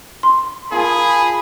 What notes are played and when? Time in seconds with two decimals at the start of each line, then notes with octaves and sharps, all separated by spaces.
0.23 C6
0.72 F4 G#4 A#4 A5 B5